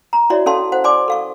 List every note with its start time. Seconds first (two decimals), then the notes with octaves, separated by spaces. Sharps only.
0.13 A#5
0.30 E4 F#4 C#5 D5 E5
0.46 C#4 A4 F5 A5 C6
0.72 C5 F#5
0.84 D5 G#5 C6 D6
1.08 A4 F5 C#6